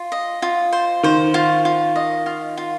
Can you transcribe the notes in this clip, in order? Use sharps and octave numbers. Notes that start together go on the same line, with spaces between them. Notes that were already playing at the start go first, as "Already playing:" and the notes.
Already playing: F4
D#5
F4
C5
D#3 C5
F4
F4
D#5
F4
F4